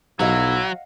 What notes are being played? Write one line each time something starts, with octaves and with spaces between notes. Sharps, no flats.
B1 F#3 E4 D#5 F5 F#5